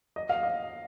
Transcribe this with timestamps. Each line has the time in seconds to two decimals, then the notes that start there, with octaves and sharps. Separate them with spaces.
0.16 D#5
0.29 F5
0.43 D#5